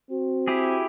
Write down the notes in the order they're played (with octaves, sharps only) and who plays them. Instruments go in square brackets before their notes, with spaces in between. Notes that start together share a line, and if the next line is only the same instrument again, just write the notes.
[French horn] C4 [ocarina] F#4
[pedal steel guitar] E4 G4 G#4